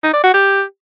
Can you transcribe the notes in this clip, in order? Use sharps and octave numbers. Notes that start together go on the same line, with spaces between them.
D#4
D5
F#4
G4